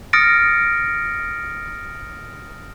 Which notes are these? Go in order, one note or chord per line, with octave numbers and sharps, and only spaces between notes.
D#6 F6 A6 A#6 C#7 D7